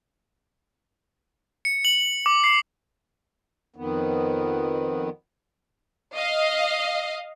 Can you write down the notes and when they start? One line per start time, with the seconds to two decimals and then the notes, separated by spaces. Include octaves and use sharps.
1.65 C#7
1.85 F#7
2.26 D6
2.44 C7
3.76 F2 D#3 B3
6.14 D#5 F5